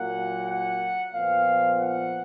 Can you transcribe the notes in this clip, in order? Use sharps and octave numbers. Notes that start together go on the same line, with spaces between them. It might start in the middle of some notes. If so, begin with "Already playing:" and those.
Already playing: A#2 F#3 A#3 F#5
F#5
A#2 F3 B3 F5
F#5